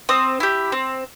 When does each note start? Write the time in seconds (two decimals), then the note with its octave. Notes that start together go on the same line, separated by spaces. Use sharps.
0.09 C4 D#6
0.40 E4 G4
0.72 C4